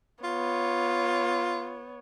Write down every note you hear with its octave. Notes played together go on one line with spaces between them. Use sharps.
B3 F4 C#5